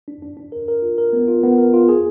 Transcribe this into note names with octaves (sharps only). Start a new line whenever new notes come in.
D4
D4
D4
A#4
A#4
F4
A#4
B3
F4
B3
A#4
F4
G#4